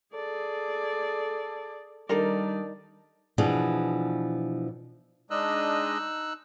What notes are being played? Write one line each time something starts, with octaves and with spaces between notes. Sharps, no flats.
G#4 A4 D5
D#3 G3 D4 A4 A#4 D5
B2 E3 F3 D4 G#4
G#3 D4 D#4 D#5 E6 F#6